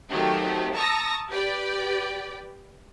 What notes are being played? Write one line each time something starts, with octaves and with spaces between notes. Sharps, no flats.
D#3 F#3 A3 C4 G4
A5 A#5 C#6 D#6 E6 A#6
G4 B4 D5 G5